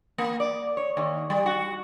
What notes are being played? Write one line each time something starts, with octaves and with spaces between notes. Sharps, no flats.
A#3
D5
C#5
D#2
G3
F#4